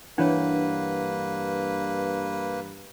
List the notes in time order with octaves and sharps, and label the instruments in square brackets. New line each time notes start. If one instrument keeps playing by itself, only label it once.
[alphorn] G2 [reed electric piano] E3 F#5 [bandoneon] A#3 B4 [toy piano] D4 C#5